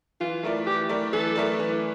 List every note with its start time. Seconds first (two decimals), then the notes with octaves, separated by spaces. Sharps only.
0.20 E3 F4
0.43 A3 E4 A#4 D5
0.66 E3 G4
0.89 A3 E4 A#4 D5
1.13 E3 A4
1.35 A3 E4 A#4 D5
1.59 E3